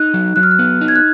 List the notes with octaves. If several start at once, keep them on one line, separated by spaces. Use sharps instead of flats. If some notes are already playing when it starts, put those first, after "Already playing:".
Already playing: D#4 F#6
F#3
F#3 F#6
F6
F#6
B3
D#4
G#6
F#6